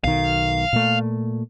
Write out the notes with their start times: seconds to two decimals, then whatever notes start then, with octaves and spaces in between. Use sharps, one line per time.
0.04 B1 D#3 F5
0.73 A#2 A3